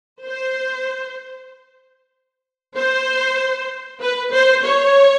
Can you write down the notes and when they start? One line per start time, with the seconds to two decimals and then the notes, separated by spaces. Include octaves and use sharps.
0.24 C5
2.75 C5
4.01 B4
4.32 C5
4.63 C#5